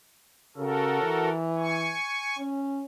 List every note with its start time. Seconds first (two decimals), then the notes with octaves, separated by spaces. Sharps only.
0.57 C#3 F#4 A4 A#4
1.02 E3
1.58 G#5 C#6
2.38 C#4